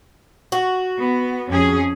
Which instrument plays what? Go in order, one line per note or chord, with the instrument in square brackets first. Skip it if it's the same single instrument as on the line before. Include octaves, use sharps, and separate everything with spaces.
[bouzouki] F#4
[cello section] B3
F2 C#4 G#4